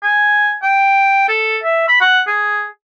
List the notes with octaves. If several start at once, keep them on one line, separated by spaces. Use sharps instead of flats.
G#5
G5
A4
E5
B5
F#5
G#4